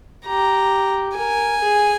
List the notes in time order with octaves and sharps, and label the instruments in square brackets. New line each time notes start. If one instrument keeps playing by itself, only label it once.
[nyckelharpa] G4 [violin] A#5
[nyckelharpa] A#4 [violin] G#5
[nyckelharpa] G#4